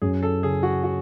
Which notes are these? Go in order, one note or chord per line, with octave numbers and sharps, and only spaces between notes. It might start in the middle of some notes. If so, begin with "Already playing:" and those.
F#2 G#4
A4
C#3 G#4
F#4
F#4